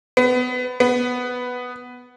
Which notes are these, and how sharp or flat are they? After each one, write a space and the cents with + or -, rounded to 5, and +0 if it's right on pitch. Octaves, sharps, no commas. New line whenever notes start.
B3 +25
B3 +5